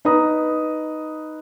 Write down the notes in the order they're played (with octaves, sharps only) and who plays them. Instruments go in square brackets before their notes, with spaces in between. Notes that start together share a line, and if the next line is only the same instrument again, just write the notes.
[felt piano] D#4 B4 A#5 D#6